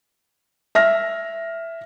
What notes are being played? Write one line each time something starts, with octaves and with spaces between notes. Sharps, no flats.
E5 F6 A#6